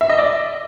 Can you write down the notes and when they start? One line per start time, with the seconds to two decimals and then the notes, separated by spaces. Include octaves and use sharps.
0.01 E5
0.10 D#5
0.19 D5